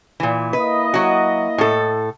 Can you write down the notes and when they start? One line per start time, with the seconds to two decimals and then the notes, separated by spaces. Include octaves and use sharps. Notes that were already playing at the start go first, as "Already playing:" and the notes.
0.20 A#2 E3
0.53 A#3 E4 B4 D#5
0.94 F#3 F#4
1.58 A2 A4